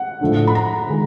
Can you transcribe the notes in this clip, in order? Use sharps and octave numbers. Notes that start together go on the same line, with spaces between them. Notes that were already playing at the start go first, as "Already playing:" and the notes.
Already playing: F#5
A2 F3 A3 D4
B5
A#5
D#3 G#3